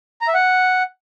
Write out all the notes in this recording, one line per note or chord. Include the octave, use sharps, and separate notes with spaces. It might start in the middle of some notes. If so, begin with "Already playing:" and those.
A#5
E5
F#5